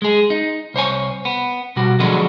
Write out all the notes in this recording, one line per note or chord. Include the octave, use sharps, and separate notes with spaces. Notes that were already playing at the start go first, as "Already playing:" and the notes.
G#3 G#4
D#4
C2 C5 C#5 G#5
B3
B2 G3 F#4
D3 F3 F#3 G#3 B3 D4